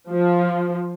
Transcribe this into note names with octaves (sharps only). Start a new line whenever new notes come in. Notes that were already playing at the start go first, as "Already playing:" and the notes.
F3